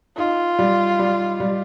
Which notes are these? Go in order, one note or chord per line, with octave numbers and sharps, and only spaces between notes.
D#4 F4
G3
G3
G3